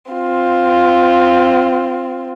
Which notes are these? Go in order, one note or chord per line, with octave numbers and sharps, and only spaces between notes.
C4 F4